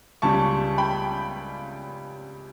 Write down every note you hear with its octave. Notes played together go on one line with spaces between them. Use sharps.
C#2 C#3 G3 A5 C#6
G5 B5